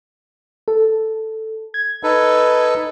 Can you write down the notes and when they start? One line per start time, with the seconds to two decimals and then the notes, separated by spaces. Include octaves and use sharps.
0.68 A4
1.74 G#6
2.03 D#4 A4 B4